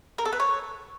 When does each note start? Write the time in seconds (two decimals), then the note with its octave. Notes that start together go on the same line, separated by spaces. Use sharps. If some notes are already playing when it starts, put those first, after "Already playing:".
0.18 A#4
0.25 A4
0.33 B4
0.40 C#5